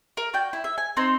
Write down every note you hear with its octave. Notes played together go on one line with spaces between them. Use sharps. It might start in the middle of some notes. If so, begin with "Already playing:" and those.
A#4
F#4 D5 G5 G6
E4
E5
G#5
C4 D#4